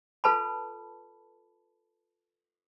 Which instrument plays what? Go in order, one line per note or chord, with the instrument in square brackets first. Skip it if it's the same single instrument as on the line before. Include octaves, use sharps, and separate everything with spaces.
[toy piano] F4 A4 B4 A5 B5